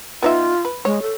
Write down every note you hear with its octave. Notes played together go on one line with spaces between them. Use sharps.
B3 D#4 F4 E5
B4
G#3 C#5
A4